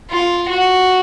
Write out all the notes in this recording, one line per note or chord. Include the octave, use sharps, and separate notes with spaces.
F4
F#4